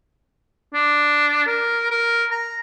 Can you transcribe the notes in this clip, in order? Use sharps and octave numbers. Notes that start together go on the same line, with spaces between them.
D4
A#4
A#4
A#5